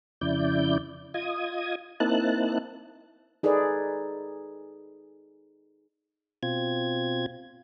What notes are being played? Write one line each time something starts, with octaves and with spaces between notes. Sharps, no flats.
F2 C#3 E4 D5 G6
F4 D#5 D#6 G#6
A#3 C4 D#4 E4 A5 F#6
D#4 G#4 A4 B4 D5
B2 C4 F4 G#6